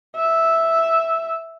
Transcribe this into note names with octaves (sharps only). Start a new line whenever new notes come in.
E5